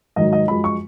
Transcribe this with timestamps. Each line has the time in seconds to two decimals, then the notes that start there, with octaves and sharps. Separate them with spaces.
0.16 G#2 D#3 F#3 D#5
0.33 D#5
0.48 F#2 F3 G#3 B5
0.64 C#6